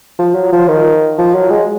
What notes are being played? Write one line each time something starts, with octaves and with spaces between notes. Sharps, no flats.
F3
F#3
F3
D#3
F3
F#3
G#3